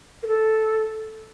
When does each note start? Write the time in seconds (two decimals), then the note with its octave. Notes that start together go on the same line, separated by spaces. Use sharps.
0.23 A#4
0.27 A4